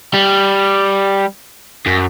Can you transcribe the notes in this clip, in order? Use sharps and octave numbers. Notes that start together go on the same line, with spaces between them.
G3
F#2